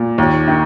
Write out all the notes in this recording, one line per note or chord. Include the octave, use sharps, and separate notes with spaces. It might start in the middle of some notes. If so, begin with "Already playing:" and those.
Already playing: A#2
D#2
D#3